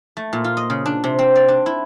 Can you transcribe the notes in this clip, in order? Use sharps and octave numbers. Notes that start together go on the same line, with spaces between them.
A3
A#2
F4
D#5
C#3
D4
C3
C4
D5
D4
E4